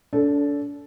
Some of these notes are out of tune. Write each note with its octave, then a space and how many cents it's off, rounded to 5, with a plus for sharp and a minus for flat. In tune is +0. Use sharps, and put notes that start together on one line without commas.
D4 -35 A4 +0